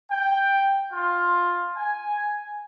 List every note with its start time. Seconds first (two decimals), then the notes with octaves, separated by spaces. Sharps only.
0.11 G5
0.92 F4
1.76 G#5